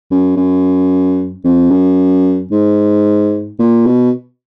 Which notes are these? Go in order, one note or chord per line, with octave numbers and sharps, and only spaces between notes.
F#2
F#2
F2
F#2
G#2
A#2
B2